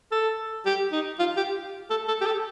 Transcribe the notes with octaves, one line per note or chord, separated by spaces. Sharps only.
A4
G4
D#4
F4
G4
A4
A4
G4
A4